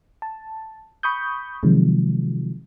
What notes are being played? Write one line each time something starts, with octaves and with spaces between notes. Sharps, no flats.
A5
B5 C#6 D#6 G6
C3 D#3 F3 F#3 G#3